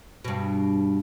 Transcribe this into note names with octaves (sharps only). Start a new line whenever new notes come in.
G2 B2